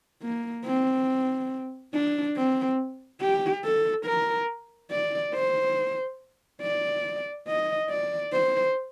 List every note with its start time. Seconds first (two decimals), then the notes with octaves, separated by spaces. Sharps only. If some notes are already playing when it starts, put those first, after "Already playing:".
0.22 A#3
0.65 C4
1.94 D4
2.36 C4
3.21 G4
3.64 A4
4.06 A#4
4.91 D5
5.34 C5
6.62 D5
7.47 D#5
7.89 D5
8.32 C5